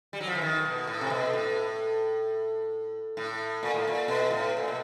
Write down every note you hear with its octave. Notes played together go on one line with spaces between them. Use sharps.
G3
F#3
F3
E3
D#3
B2
A2
C3
B2
A2
A2
A#2
A2
A#2
B2
A2
A#2
B2